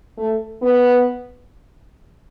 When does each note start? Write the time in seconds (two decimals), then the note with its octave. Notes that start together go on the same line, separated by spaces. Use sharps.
0.18 A3
0.62 B3